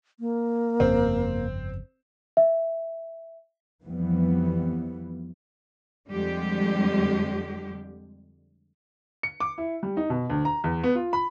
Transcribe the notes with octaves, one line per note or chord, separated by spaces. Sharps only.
A#3
G1 F2 C#3 C4
E5
F2 E3 F3 G3 B3
F2 D3 G3 G#3 G4
C#7
D6
E4
G3
D#4
B2
D2
A#5
E2
B3
F4
B5